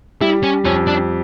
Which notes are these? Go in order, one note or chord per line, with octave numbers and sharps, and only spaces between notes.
G3 E4
C#4
F2 C#4
D4